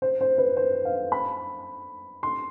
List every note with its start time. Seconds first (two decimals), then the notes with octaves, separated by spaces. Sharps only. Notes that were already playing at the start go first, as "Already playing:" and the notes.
0.02 C5
0.21 C5
0.38 B4
0.57 C5
0.85 F5
1.12 B5
2.23 C6